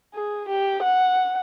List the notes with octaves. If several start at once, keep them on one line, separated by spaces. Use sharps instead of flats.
G#4
G4
F#5